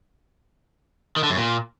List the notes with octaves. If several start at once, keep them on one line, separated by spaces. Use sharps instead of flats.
D#3
D3
F#2
A#2